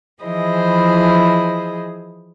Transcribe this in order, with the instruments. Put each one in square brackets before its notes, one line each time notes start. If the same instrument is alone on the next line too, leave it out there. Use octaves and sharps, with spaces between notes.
[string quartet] E3 F3 E4 G#4 C5 D#5